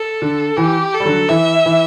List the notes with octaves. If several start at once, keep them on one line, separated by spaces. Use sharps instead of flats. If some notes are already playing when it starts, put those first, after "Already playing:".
Already playing: A4
D3
E3 G4
A4
G3
D3 F#3
E3 E5
E3